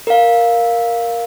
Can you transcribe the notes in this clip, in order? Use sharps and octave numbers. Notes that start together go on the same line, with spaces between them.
A#4 F5